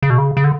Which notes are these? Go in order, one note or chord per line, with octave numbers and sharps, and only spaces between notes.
C#3
B2
C#3
C#3
D3